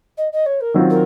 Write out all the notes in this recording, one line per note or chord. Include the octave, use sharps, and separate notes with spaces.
D#5
D#5
C#5
A#4
D#3 F#3 C4 F4
A#4